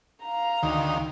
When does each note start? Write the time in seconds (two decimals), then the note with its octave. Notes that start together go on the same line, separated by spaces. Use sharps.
0.24 F5 A#5
0.63 D2 D#3